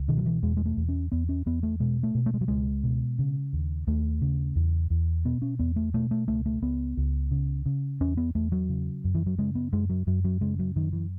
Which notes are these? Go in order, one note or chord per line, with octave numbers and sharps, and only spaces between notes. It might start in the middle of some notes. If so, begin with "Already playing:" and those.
Already playing: C#2
B2 D#3
F#3
E3
E2 G#3
G#3
A3
E2
C#4
E2 B3
C#4
E2 B3
A3
B2 G#3
A3
B2
A3
G#3
F#3
C#2 G#3
B2
C#3
D#2
D#2 A3
C#3
E2
E2
B2 B3
C#4
E2 B3
A3
B2 A3
A3
C#2 A3
A3
C#2 B3
C#2
C#3
C#3
E2 C#4
B3
E2 A3
F#3
C#3
F#2
E3
F#3
C#3 G#3
B3
F#2 G#3
F#3
F#2 F#3
F#3
C#3 G#3
F#3
F#2 D#3
E3